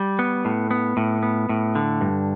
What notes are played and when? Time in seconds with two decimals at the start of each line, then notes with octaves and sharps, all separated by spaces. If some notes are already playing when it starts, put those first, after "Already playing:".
Already playing: G3
0.19 B3
0.45 A2
0.71 B3
0.97 A2
1.23 B3
1.49 A2
1.75 D3
2.01 G2